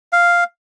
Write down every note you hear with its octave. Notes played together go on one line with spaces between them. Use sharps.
F5